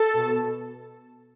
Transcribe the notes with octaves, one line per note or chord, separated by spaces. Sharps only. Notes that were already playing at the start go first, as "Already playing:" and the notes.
Already playing: A4
B2